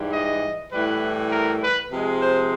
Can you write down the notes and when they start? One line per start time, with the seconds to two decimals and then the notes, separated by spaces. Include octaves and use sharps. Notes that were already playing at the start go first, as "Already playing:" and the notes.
Already playing: G#2 E3 G3
0.12 D#5
0.71 A2 E3 G3 B4
1.30 A#4
1.61 B4
1.90 C3 F3 G#3
2.20 C5